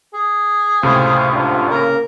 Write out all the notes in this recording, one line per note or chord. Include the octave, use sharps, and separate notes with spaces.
G#4
C#2 A2 C3 C5 F5
G#2 D4 F4
C#3 A#3 A#4